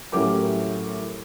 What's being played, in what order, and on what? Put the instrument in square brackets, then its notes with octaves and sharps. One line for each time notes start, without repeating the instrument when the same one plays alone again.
[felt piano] A2 F#3 C#4 G4 A#4 D6